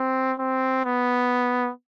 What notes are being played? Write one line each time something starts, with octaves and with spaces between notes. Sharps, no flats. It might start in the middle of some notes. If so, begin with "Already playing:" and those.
Already playing: C4
C4
B3